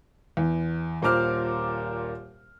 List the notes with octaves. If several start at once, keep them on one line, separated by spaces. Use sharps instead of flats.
E2
D#1 A#2 A#4 C5 D6 F6